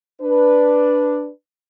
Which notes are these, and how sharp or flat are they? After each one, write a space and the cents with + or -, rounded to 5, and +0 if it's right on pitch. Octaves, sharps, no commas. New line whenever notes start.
D4 +0 B4 +0